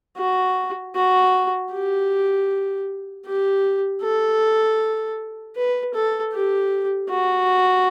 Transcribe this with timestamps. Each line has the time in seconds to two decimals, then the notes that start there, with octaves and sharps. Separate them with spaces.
0.18 F#4
0.95 F#4
1.72 G4
3.26 G4
4.02 A4
5.56 B4
5.94 A4
6.33 G4
7.10 F#4